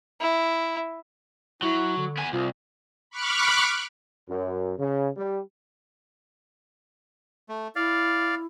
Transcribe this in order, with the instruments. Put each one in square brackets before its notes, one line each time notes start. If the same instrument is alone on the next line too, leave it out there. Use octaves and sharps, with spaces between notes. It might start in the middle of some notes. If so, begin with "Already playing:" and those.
[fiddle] E4
[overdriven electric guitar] F#3 [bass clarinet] E4
[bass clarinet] D3
[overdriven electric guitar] B3 G#5
[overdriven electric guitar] C2 [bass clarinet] F4
[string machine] B5 C#6 D6 F6 F#6
[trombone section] F#2
C#3
G3
[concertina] A3
[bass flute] E4 [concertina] D5 F5